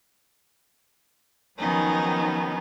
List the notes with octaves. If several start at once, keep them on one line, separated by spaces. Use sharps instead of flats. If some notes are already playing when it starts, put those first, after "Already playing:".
D#3 F3 F#3 B3 C#4 D#4